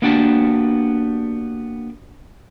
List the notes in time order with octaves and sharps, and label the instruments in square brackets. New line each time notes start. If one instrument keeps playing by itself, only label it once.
[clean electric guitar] A#3 B3 D4 F#4 G4 A5